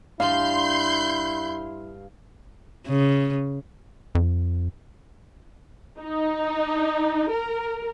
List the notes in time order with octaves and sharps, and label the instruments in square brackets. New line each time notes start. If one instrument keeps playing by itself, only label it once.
[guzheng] G2 G3 [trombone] E4 [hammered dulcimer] F5 [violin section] C6 G6
[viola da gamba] C#3
[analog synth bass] F2
[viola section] D#4
A#4